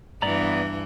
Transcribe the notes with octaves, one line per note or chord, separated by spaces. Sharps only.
G2 E3 B3 D5 A#5